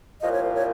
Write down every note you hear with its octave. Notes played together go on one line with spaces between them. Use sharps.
C2 A#2 F3 D#5
C#5
C5
C#5